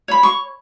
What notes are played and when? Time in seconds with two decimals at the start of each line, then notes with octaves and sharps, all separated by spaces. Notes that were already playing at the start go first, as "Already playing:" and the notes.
0.08 C#5 B5
0.23 C#6